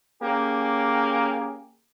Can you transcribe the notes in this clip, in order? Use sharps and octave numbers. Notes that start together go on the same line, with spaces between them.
A#3 C#4 G4 G#4